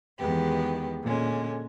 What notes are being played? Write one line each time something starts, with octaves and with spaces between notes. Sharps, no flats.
E2 D#3 G#3 B3 G4
A#2 D3 G#3 C#4